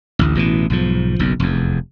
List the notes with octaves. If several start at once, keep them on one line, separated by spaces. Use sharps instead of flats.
A1 D2
A1 B2 D3 E3
B1 G#2 F3
F#1 B1 F#2
F1 E2